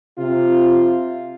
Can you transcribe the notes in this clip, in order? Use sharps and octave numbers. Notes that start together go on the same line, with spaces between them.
C3 F4